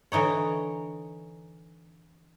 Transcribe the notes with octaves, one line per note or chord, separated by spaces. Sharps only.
D3 E3 D#4 C#5